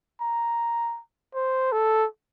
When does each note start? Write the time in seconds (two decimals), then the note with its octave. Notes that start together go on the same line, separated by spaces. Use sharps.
0.21 A#5
1.34 C5
1.72 A4